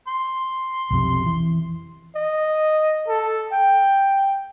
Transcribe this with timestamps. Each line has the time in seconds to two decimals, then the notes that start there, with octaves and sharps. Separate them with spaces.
0.08 C6
0.90 B1 F2 C3
1.26 E3
2.16 D#5
3.08 A4
3.52 G5